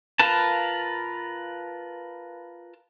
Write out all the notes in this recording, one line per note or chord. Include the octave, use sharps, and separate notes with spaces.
F4 A#4 B4 A5